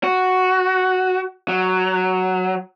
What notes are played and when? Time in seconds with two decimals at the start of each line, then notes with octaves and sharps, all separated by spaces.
0.04 F#4
1.48 F#3